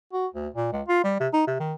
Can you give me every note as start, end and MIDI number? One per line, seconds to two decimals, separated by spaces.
0.13 0.27 66
0.34 0.48 38
0.54 0.69 46
0.72 0.82 37
0.88 1.03 65
1.04 1.20 55
1.20 1.28 48
1.33 1.43 63
1.47 1.57 48
1.60 1.74 51